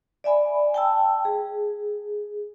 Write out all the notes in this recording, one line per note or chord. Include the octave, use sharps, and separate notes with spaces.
D5 E5 G#5 B5
G5 A5 E6
G#4